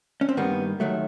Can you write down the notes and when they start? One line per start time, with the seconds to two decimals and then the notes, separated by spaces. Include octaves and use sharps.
0.21 C#4
0.29 C4
0.37 G2 D#3 G3 A#3 B3
0.80 D#2 D#3 F#3 A3